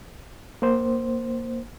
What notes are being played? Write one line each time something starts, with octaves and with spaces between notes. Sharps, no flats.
A#3 C5